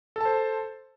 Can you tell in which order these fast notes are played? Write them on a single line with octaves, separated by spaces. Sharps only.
A4 A5 C5